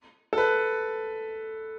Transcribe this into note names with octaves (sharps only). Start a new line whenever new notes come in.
A4
B4